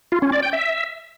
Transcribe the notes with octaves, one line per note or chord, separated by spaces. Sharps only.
F4
C#4
D5
G5
E5